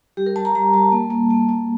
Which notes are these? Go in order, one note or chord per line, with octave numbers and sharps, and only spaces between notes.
G3 G4
A#4
G3 A5
A#5
G3 A#5
G3 A5
A#3
A#3
A#3
A#3